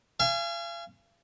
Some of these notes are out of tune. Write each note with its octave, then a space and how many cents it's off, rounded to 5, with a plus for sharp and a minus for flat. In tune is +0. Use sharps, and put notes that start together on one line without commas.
F5 -40 G#5 +5